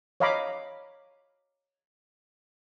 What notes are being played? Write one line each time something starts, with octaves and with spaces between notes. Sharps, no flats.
C#5 D#5 F5 A#5 B5 D6